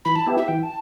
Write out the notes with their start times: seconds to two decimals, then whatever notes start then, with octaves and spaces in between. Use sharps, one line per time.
0.05 E3 B5
0.16 A5
0.26 B3 E4 G4
0.37 E5
0.48 E3 G5
0.63 A5